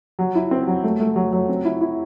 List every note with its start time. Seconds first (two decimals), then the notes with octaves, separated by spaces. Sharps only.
0.19 F#3
0.35 E4
0.51 C4
0.67 F#3
0.83 A3
1.00 A3
1.16 F#3
1.33 F#3
1.49 C4
1.65 E4
1.81 E4